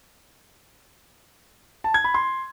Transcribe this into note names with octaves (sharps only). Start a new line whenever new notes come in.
A5
G#6
B5
C6